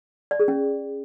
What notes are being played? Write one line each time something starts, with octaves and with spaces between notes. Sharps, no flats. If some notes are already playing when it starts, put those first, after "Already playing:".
D5
G#4
C#4